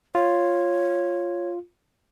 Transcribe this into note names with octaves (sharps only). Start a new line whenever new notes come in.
F4 C#5